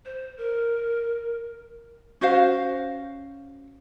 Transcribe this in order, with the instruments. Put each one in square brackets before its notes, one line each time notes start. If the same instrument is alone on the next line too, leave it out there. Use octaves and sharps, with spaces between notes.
[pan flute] C5
A#4
[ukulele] C#4 F#4 C5 F5